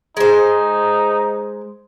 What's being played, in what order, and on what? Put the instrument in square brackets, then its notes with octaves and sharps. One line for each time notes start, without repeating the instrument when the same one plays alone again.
[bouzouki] G#3 C5 [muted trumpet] D#4